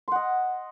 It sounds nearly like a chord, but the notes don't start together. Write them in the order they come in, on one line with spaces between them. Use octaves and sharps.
C6 F#5 D#5